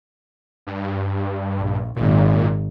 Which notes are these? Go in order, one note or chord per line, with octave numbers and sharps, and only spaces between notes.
G2
A#1
G#1 A#2